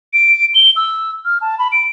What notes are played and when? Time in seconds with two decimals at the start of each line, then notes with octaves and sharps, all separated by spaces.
0.13 D7
0.55 G7
0.76 E6
1.25 F6
1.41 A5
1.58 B5
1.72 D7